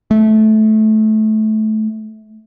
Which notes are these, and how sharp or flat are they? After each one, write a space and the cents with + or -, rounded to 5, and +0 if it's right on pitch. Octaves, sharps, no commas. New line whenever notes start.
A3 -20